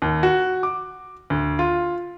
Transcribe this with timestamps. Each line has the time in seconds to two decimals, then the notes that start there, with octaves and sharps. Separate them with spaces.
0.02 D#2
0.23 F#4
0.63 D6
1.30 D2
1.59 F4